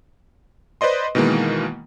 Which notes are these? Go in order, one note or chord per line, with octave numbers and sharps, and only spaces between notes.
B4 C5 D5 D#5 C6
B2 D#3 E3 G#3 A#3